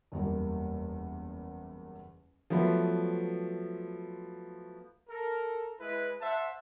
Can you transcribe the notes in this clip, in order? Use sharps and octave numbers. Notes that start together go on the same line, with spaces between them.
F#1 E2 G3 A#3
F3 F#3 A3 B3 B4
A4 A#4
G#3 E4 B4
C5 E5 F#5 A5